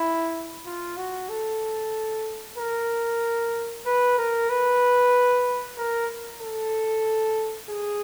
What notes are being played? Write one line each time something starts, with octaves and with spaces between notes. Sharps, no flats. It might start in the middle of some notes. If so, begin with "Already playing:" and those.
Already playing: E4
F4
F#4
A4
A#4
B4
A#4
B4
A#4
A4
G#4